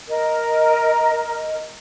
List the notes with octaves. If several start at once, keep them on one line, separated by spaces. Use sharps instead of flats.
A#4 D#5